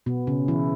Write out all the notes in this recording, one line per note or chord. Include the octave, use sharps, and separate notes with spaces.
B2 B3
C#3 C#4
E3 E4